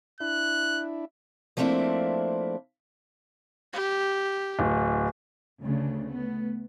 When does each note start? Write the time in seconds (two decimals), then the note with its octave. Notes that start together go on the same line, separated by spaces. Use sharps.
0.20 D4 E4 F#6
1.57 F3 A3 A#3 C4 D4 E4
3.73 G4
4.59 D1
5.61 D2 C#3 A3 D4
6.04 A3 B3